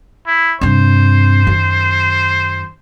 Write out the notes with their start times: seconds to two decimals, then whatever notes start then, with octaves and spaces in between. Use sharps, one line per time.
0.27 E4
0.61 G2 C3 C5
1.47 F#2 D#3